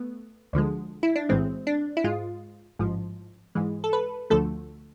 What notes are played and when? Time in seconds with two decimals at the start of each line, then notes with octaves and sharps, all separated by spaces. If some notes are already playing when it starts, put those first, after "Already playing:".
Already playing: A3 B3
0.53 D2 D3 F3 G#3
1.03 E4
1.16 D4
1.29 B1 A2 E3 G#3 C4
1.67 D4
1.97 E4
2.04 G#2 G#3 F4
2.79 A1 G#2 F3
3.55 G#2 E3 G#3
3.84 A4
3.93 B4
4.30 D2 D3 F3 A3 A4